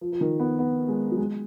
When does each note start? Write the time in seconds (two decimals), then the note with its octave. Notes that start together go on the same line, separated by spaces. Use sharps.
0.01 F3
0.12 F3
0.21 D#3
0.40 B3
0.59 B3
0.88 G#3
1.11 F#3
1.18 G#3